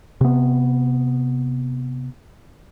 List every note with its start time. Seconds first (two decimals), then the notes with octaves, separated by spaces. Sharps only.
0.21 C3 B3